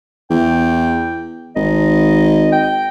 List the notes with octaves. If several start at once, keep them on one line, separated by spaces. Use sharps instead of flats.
E2 G5
G#1 D#5
G5